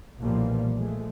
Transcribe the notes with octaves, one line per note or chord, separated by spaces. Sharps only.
B1 A#2 E3 F3 G3 A#3
F3 G#3 A3